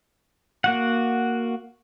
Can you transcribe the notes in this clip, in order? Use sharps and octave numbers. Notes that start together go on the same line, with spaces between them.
A#3 F#4 F#5